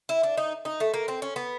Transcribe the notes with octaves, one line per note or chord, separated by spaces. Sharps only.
E4
D4
D#4
D#4
A3
A#3
C4
C#4
B3